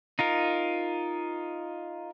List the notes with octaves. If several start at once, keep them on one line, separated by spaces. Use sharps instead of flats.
D#4 F4 A#4